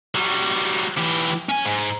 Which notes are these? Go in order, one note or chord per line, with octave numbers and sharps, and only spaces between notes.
F#3 G3
E3 G4
C#4 G#5
G#2